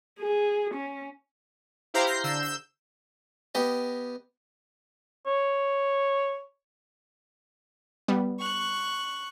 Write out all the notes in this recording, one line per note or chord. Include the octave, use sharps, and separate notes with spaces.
G#4
C#4
E4 G4 C5 F5 A#5
G6 A#6 C7
D3 E6 G6
E6 G6
B3 G4 D#5
C#5
G3 B3
C#6 F#6